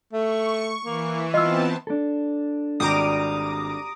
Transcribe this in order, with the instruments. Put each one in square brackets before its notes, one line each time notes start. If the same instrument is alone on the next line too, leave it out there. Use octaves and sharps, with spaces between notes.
[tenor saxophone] A3 [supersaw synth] C#6
[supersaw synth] E3 [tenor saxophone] A#3
[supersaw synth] B3 C4 A5 [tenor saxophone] F4 [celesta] D#5 E6
[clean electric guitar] D4 A4
[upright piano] G#1 [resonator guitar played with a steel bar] G3 [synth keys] A#5 D6 D#6